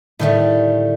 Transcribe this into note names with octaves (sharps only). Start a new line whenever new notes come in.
A2 D3 D#3 G3 A3